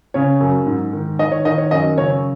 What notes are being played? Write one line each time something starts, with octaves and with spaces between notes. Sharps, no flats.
C#3 C#5
F#2
G#2
D#3
D#3 D#5
C#5
D#3 D#5
C#5
F#2 D#5
C#3 C#5